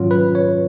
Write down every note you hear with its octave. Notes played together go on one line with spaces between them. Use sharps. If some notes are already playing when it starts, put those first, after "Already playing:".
Already playing: G#2 D#3 F#3 C#4 F4
B4
C#5